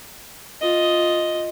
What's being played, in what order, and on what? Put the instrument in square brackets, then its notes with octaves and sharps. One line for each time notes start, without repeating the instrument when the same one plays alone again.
[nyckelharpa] F4 D#5